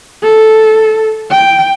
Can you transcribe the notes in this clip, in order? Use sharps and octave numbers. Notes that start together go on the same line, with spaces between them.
A4
G5